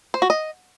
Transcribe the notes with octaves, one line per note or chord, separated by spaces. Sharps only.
C5
F#4
D#5